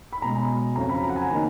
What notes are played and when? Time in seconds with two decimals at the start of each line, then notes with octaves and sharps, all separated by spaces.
0.13 B5
0.22 B1 B2 G#3 A#5
0.76 F2 C#3 F#3 C#4 A#5
0.89 B5
1.03 A#5
1.10 F#5
1.16 G#5
1.29 D#3 A#3 D#4 A#5